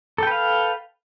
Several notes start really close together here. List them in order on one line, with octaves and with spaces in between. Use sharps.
A4 G5 B4 F5